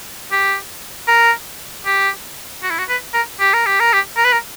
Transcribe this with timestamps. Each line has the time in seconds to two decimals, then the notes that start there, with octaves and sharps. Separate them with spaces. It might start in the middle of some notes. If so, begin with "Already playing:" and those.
0.32 G4
1.08 A#4
1.86 G4
2.63 F#4
2.70 E4
2.78 F#4
2.89 B4
3.13 A#4
3.40 G4
3.53 A#4
3.66 G4
3.80 A#4
3.93 G4
4.17 A#4
4.25 B4
4.33 A#4